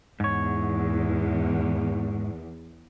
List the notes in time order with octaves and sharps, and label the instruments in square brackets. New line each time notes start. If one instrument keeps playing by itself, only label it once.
[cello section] E2 [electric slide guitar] G#2 C#5